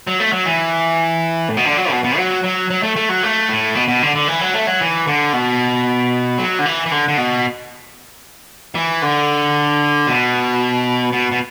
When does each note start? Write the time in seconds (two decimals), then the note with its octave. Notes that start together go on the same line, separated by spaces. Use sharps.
0.07 F#3
0.20 A3
0.33 F#3
0.46 E3
1.49 A2
1.57 B2
1.65 D3
1.77 F#3
1.91 B2
2.04 B2
2.17 F#3
2.44 F#3
2.70 F#3
2.83 A3
2.96 A3
3.09 F#3
3.23 A3
3.49 A2
3.75 B2
3.88 B2
4.02 D3
4.15 D3
4.28 E3
4.41 F#3
4.54 A3
4.67 F#3
4.81 E3
5.07 D3
5.33 B2
6.38 F#3
6.59 D3
6.66 E3
6.86 E3
6.91 D3
7.08 D3
7.18 B2
8.75 E3
9.02 D3
10.07 B2
11.12 B2
11.32 B2